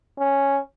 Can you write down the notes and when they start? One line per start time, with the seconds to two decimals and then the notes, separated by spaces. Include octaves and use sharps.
0.19 C#4